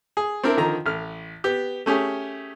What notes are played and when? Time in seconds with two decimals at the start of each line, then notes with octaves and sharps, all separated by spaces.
0.17 G#4
0.44 C4 D4 E4 A#4
0.57 D3 D#3 F3 A#5
0.86 A1 F6
1.44 B3 G4
1.86 A3 C#4 G4 G#4